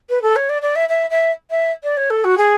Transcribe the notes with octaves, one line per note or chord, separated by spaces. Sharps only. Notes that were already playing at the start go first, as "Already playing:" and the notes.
B4
A4
C#5
D5
D5
E5
E5
E5
E5
D5
C#5
A4
F#4
G#4